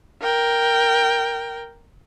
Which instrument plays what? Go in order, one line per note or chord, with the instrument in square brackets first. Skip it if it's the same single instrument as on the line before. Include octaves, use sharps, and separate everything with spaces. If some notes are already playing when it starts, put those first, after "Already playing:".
[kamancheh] A#4 G5